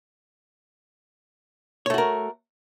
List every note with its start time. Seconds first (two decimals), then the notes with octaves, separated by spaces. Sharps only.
1.86 C#5
1.90 A3
1.94 F#4
1.98 A#4